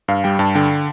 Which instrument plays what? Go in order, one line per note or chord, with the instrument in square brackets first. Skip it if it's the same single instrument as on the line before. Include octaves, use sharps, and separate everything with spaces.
[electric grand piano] G2 [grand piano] F5
[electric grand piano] G3 [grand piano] G5
[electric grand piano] G2 [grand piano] A5
[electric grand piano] D3 [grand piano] G5